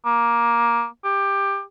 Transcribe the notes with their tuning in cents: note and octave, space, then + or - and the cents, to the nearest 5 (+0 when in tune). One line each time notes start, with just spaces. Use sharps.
A#3 +15
G4 +15